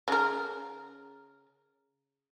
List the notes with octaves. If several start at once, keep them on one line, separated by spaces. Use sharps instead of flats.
C#3 A#4